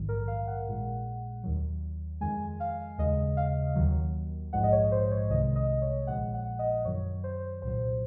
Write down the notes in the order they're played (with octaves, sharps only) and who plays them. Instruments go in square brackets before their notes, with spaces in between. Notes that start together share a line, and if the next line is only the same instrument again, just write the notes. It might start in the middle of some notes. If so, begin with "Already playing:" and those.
Already playing: [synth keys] A#1 G#2 D#3 F#3
A#4
F5
F#5
A#1 A#2 G#3
D#2 D#3 F#3
F2 D#3 G#3 G#5
F5
D#2 C#3 G#3 D#5
F5
D#2 D#3 F#3
A#1 G#2 F3 G#3 F#5
D#5
C#5
C5
C#5
C2 C3 D#3 G#3 D#5
D#5
C#5
A#1 A#2 F3 G#3 F#5
F#5
D#5
F#2 D#3 F#3 C#5
C5
C2 A#2 F#3 C5